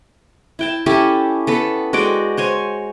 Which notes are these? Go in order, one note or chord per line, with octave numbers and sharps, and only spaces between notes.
E4 G5 A5
C#4 E4 G4 A4
B3 A4 B5
G#3 F#4 D5 G5
C5 C#5 G#5